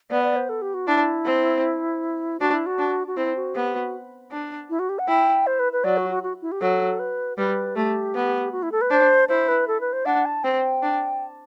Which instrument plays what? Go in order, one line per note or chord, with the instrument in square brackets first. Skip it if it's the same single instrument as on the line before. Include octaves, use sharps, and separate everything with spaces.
[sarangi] B3 [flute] D5
[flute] D5
C5
A4
G4
F#4
[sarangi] D4 [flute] E4
[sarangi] C4
[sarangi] D4 [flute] F#4
[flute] E4
F#4
[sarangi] D4
[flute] F#4
[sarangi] C4 [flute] E4
[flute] F#4
[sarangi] B3 [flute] G4
[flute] F#4
[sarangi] D4
[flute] E4
F#4
G4
F#5
[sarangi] E4 [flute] G5
[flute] C5
B4
B4
[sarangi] F#3 [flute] D5
[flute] F#4
F#4
F#4
E4
G4
[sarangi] F#3 [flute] A4
[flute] B4
[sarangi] G3 [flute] B4
[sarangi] A3 [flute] G4
[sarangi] B3
[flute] F#4
E4
A4
B4
[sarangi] D4 [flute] C5
[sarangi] E4 [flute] C5
[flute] B4
A4
B4
C5
[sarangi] D4 [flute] F#5
[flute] A5
[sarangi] C4 [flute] G5
[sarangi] D4